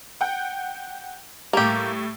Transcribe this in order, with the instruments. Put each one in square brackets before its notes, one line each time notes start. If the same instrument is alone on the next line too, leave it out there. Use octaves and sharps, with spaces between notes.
[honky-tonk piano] F#5 G5
[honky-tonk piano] A2 G3 [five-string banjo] A#3 G4